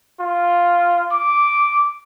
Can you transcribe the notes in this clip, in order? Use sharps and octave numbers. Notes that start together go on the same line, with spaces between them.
F4
D6